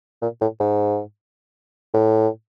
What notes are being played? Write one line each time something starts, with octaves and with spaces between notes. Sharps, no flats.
A#2
A2
G#2
A2